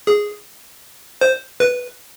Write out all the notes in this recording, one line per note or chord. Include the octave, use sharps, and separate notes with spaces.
G#4
C5
B4